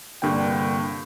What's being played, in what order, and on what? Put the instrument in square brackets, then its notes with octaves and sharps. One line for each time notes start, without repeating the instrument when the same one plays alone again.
[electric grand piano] C2 G2 D3 A#3 G5